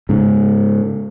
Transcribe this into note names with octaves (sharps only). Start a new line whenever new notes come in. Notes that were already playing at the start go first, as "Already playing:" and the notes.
G#2 C#3